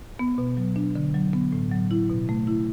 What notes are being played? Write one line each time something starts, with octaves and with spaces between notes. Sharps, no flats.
B3
B2
F#3
D4
D3
F#3
B3
A2
F#3
E4
B2
A3
E4